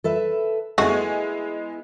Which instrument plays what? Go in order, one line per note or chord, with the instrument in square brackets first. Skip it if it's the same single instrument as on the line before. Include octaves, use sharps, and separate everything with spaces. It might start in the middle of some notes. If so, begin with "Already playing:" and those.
[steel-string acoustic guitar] A4 B4 E5
[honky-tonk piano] G#3 G#5 [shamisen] A3 F#4 [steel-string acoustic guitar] B3 E4 G#4